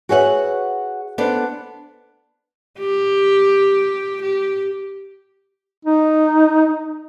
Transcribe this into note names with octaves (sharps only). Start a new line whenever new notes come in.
F#4 G#4 B4 C#5 E5 F#5
B3 D4 A4 C5 D5
G4
G4
D#4